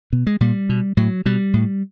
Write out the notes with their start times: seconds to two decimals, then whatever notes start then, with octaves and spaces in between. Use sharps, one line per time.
0.13 B2
0.27 G#3
0.41 A#2 G3
0.69 B2
0.97 A2 F#3
1.26 B2 G3
1.54 A2